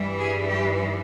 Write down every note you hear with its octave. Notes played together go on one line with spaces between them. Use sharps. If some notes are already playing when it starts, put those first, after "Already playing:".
Already playing: G2 E3 G3
G#4
G4